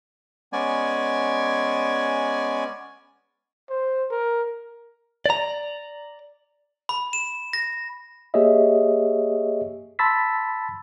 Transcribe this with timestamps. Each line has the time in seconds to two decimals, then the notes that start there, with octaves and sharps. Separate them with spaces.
0.53 G#3 B3 C#4 D5 G#5
3.70 C5
4.10 A#4
5.26 D5 A#5
6.89 B5
7.13 E7
7.53 A#6
8.34 A#3 G4 G#4 C#5 D#5 E5
9.99 A5 B5 C6 E6 A6 B6